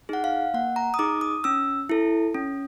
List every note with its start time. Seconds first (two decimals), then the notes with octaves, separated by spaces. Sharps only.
0.09 D#4 G#4 F#5
0.24 F5
0.54 A#3 F#5
0.76 A#5
0.94 D#6
0.99 D#4 G#4 D6
1.21 D#6
1.44 C#4 E6
1.89 E4 A4
2.34 C#4